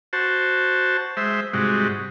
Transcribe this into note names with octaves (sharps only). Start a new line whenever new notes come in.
F#4 C5 A5
G#3 C5 E5
G#2 C3 G3 G#3 F#4